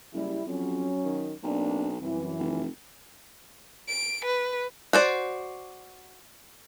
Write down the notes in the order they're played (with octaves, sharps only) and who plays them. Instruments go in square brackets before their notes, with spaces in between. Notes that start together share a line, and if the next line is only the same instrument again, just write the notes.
[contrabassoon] F#1 [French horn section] G3 E4
[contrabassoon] F2 [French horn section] F#3 C#4
[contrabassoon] D#3
[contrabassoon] B1 [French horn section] A#3 C4 D4
[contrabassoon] C2 [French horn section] F#2 E3
[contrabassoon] F1
[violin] D7
B4
[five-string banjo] F#4 C5 D5